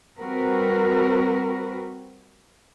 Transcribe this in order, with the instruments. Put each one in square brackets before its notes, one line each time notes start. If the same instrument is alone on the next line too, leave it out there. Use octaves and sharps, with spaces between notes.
[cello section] G3 C4 F#4 A#4 B4